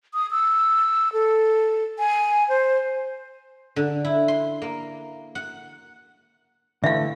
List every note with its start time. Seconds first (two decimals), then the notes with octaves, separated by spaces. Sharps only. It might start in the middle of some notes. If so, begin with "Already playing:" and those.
0.14 D#6
0.31 E6
1.13 A4
1.99 G#5
2.49 C5
3.76 D3
4.05 E4
4.28 C6
4.62 A#3
5.35 F#5
6.84 D3 E3 A3 E5 F5